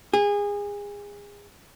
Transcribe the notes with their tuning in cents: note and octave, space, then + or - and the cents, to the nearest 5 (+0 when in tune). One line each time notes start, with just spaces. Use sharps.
G#4 -25